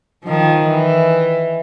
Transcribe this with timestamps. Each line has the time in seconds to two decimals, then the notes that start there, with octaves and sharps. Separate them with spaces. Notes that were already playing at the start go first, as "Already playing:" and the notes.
0.24 D#3 F3
0.69 E3